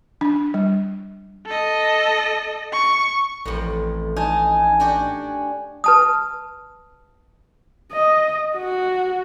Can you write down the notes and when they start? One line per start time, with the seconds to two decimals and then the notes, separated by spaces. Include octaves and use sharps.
0.21 D4
0.54 G3
1.46 A4 D#5
2.72 C#6
3.45 A1 F2 A2
4.17 D#4 G#5 A5
4.80 D4 F#4 G4
5.84 B4 A5 D#6
7.92 D#5
8.56 F#4